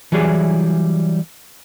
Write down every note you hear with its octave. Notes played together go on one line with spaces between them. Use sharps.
E3 F#3 G3 E4 G#4